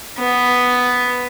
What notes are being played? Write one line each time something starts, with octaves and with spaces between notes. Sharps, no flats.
B3